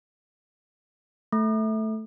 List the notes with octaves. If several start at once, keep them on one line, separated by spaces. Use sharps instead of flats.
A3